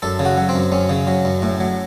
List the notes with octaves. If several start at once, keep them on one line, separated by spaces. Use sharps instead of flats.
F#2 A4
C#3
F#4
F#3
C4
F#2
F#2 C#4
C#3
F#3
F#2
A2
F#3